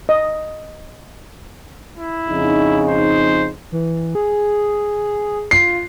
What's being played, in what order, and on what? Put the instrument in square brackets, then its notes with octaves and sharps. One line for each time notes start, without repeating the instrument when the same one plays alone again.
[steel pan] D#5
[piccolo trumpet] E4
[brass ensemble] F2 C#3 D#4
[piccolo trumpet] C5
[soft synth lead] E3
G#4
[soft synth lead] F4 [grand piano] C7